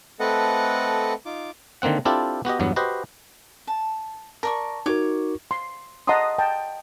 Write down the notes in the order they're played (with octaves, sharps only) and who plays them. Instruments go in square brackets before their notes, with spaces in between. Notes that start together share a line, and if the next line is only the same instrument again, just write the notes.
[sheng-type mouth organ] A3 C4 A4 B4 D#5 F#5
D#4 F4 D6
[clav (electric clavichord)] D3 D#3 A#3 C4 F#5
C4 D4 E4 F4 G4 A4
B3 F#4 G4 D#5
E2 G2 F#3 B3
F#4 G4 B4 C5 D#5
[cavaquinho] A5
[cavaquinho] A#4 D5 C#6 [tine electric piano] A5
[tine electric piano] D#4 F#4 A#4 [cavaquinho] C#5 D6
[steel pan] C6
D#5 F#5 A5 A#5 C6 D#6
G5 A5